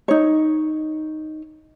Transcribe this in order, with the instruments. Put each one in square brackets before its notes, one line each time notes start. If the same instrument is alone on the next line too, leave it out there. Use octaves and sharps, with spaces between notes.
[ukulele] D#4 C#5